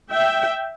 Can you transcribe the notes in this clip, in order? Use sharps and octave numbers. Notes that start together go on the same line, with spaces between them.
E5 G5